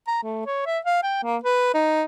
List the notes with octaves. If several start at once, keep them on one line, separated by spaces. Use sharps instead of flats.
A#5
A3
C#5
E5
F5
G5
A#3
B4
D#4